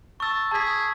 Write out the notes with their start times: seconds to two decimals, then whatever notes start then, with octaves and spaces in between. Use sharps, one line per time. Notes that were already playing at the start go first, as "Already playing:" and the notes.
0.20 A5 C#6 E6
0.51 G#4 A5 B6